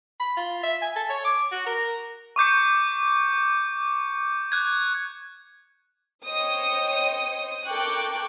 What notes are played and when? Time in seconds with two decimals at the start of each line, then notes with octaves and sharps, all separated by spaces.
0.20 B5
0.37 F4
0.63 E5
0.82 G#5
0.96 A4
1.09 C#5
1.25 D6
1.52 F#4
1.66 A#4
2.36 C#6 D6 G6 C#7
4.52 F#6 G#6
6.26 C5 C#5 D#5 G5 D#6
7.66 A4 A#4 G5 C#6 D6 F#6